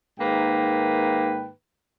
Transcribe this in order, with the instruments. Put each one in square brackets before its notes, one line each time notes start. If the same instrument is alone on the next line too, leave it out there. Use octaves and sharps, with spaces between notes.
[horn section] G#2 D#3 A#3 B4 G5